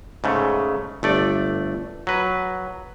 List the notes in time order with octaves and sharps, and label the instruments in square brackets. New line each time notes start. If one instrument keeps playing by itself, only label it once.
[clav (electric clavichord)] G#2 C#3 A3
G1 A3 D5
F#3 B4